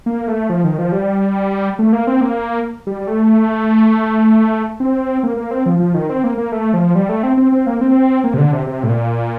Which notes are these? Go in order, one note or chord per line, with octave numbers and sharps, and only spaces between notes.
A#3
A3
F3
D#3
F3
G3
A3
A#3
C4
A#3
G3
A3
C4
A#3
A#3
C4
F3
F3
D#3
C4
A#3
A#3
A3
F3
G3
A3
C4
C4
C4
A#3
C4
A#3
C3
D3
C3
C3
A2
A#2